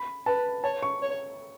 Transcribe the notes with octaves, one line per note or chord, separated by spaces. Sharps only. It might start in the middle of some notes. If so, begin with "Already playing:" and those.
Already playing: B5
B4 A5
C#5 A5
C#6
C#5